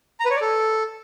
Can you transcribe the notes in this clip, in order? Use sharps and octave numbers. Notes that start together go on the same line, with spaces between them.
A#5
B4
C#5
D5
A4